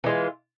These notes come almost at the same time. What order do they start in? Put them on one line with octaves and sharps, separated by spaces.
E3 G#3 F4